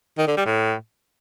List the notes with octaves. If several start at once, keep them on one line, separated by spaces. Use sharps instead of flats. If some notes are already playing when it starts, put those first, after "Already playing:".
D#3
D3
G3
A2